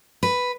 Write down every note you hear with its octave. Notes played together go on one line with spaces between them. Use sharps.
B4